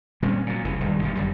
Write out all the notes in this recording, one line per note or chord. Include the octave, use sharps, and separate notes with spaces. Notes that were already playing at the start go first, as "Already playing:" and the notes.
A#2 G3 C4 C#4
A#2 F#3
F1 C2 C#3 E3
D#1 G2 D#3 G3
G1 A#2 G3
G1 F#2 G3